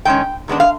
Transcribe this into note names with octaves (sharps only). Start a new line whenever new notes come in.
D#3 G#3 C#4 G5
D#3 G#3 B3 D4
F5